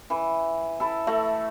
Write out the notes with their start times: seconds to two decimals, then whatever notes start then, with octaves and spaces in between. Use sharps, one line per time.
0.10 E3
0.80 E4 A4
1.07 A3 E5